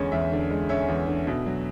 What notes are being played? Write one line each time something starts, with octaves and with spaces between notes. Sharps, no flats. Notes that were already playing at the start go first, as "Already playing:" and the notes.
Already playing: E2 D3 G#3 C#4
E2 E5
D3
G#3
C#4 E5
E2
D3
B2
F#3